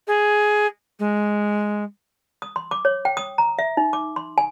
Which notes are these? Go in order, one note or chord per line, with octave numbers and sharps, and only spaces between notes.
G#4
G#3
D#6
C6
D6
C#5
G5
D#6
A#5
E5
D#4
D6
C6
G#5